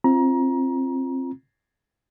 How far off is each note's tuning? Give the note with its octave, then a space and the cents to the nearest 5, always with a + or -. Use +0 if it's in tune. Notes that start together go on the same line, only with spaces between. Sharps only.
C4 +20 F4 -15 A#5 +25